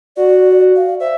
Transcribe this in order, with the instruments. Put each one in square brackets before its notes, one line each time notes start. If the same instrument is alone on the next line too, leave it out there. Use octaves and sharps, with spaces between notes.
[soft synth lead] F#4 [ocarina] D5
[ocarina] F5
[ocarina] C5 [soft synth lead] E5